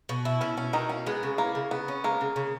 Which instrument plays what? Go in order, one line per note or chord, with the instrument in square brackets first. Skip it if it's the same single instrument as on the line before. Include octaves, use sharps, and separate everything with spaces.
[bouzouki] B2
E4
[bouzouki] B2 [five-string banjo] C#4
[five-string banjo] C#4 [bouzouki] E4
[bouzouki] B2 [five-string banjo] D#3 D#4
[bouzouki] A#3 [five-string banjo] C#4
[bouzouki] G#3 [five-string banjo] B3
[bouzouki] C#3
[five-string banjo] A#3 [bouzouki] E4
[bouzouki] C#3
[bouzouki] C#3 [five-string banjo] B3
[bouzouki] C#4
[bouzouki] G#3 [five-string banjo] A#3
[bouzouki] C#3
C#3